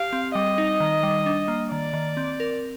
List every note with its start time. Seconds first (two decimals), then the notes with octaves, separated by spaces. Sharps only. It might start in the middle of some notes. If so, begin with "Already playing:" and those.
Already playing: G4 F5
0.13 C4
0.35 G3 D#5
0.58 D#4
0.80 D#3
1.03 G3
1.26 D4
1.48 A#3
1.71 D#3 D5
1.94 D#3
2.17 C4
2.40 A#4